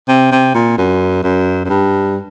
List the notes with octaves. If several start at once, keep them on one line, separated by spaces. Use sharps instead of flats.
C3
C3
A#2
F#2
F#2
F#2
G2